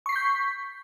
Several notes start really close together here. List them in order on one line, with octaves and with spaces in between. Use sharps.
C#6 C7 B6 G6